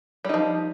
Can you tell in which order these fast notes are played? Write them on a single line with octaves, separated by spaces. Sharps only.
G3 D#4 F3